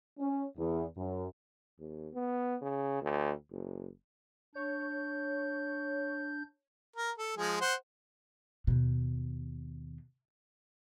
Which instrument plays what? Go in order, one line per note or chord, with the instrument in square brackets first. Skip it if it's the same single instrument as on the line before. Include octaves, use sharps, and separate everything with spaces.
[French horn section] C#4
E2
F#2
[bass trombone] D#2
B3
C#3
D2
F#1
[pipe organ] D4 G6 [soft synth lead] C#5
[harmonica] A#4
A4
F3 G#3 G#4
C5 F#5
[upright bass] D#2 B2